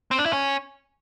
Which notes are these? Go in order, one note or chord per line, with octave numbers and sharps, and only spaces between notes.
C4
D4
E4
C#4